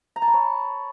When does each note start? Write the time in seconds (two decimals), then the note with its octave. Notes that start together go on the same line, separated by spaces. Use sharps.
0.16 A#5
0.22 A5
0.28 B5
0.34 C#5